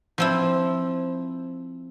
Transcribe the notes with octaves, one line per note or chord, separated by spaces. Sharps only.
F3 C4 E4